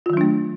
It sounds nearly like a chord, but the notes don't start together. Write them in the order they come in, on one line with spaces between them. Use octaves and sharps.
F4 D#3 F#3 D4 A3